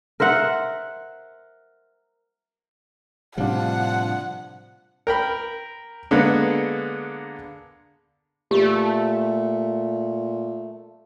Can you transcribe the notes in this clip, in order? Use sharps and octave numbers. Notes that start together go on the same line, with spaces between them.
A#4 C5 E5 F#5
A2 C3 F3 G3 D4 F5 F#5
A#4 G5 B5
D3 G#3 A#3 B3
A#2 A3 G4